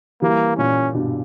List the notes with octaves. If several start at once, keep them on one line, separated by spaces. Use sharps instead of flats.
E3 G3 A#3
A#2 C#4
G2 B2